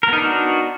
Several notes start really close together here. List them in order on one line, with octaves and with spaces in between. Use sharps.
A#4 B3 D#4 D4 F#4